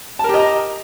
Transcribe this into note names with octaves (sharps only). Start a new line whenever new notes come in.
G4 A#4 D#5 A5 A#5